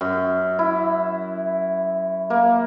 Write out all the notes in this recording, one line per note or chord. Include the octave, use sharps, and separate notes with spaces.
F#2
E4
A#3